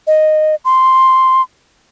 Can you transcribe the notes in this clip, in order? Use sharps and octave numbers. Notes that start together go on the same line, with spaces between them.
D#5
C6